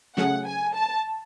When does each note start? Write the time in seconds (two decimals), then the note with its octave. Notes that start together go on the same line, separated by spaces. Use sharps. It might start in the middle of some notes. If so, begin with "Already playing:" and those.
0.16 C#3 F#3 A3 C#4 G#4 F#5
0.45 G#5
0.74 A5